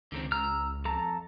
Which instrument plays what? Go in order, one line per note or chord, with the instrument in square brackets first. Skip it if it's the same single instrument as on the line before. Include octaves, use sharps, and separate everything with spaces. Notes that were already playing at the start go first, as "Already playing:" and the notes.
[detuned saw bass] C#2 [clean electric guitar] D3 D#3 C4
[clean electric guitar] A#5 [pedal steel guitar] E6 F6
[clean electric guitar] F2 [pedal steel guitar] A4 A5 A#5